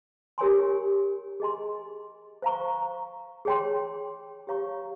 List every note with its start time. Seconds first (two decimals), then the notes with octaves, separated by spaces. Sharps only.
0.38 G4 A#4 C#5 G#5 C6
1.40 G#4 D#5 G#5 C6
2.42 C5 F5 A#5 C#6
3.45 G#4 C#5 G5 C6
4.47 G4 C#5 F5 A#5 C#6